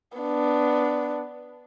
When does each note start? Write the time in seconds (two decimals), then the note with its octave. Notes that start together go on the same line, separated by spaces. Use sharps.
0.18 B3 D4